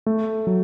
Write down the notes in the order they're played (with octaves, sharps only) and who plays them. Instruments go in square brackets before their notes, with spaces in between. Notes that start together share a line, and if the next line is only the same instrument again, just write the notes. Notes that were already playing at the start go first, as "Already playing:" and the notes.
[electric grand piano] A3
F#3